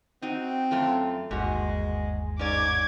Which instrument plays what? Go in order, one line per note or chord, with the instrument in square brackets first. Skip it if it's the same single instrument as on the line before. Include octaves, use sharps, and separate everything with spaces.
[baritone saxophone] C4 [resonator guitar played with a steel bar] D#4 F#4
[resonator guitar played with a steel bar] F#2 A3 F4
[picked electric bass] G1 D#2 [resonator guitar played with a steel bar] G#2 F#4 [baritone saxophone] G#3
[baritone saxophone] G#2 [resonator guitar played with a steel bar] C#4 D5 [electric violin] D6 G#6